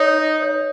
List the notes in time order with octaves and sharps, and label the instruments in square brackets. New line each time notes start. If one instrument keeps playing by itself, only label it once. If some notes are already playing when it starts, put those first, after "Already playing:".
Already playing: [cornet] D#4 [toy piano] C#5
[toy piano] C#5